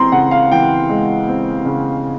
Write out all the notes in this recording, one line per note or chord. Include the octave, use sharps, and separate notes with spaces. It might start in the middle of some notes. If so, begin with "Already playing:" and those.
Already playing: E3 G#3 C4 A#5 C6
C#3 F#5
F5
E3 G5
G#3
C4
C#3